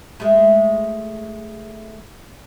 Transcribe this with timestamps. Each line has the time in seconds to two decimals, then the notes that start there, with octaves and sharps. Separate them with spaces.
0.20 G#3 A3